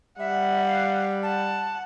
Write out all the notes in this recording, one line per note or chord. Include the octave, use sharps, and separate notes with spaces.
G3 E5 F#5
F5
F#5 A5